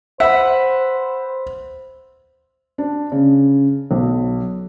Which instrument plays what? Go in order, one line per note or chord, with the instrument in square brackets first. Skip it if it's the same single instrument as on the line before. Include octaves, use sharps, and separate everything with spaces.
[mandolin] B4 F#5 [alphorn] C5 [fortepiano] E5
[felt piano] D4
C#3
B1